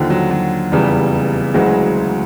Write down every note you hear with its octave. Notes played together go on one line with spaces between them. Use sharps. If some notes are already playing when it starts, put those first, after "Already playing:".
Already playing: D#2 D3 F3
F#3
F#3
F1 E2 C#3 G3
D2 C#3 E3 F#3 G#3